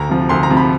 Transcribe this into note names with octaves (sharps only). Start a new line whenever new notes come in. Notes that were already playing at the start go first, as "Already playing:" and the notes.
Already playing: D2 A#5
C3 F3
D2 C6
A#5
C3 F3
B5